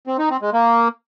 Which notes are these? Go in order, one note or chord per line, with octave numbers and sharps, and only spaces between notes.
C4
D#4
C4
G#3
A#3